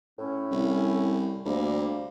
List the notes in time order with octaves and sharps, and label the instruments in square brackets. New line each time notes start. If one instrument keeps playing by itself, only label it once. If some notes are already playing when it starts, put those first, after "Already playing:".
[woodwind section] A2 C#4
[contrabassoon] C2
[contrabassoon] D2 [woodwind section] C3 G3 A#3